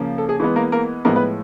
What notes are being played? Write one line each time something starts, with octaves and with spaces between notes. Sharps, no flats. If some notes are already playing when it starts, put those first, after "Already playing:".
Already playing: C#3 F3 A#3
A4
G#4
E3 G#3 B3
A#3 A#4
A#3 A#4
A2 F3 G#3 A#3 B3 A#4
B3 B4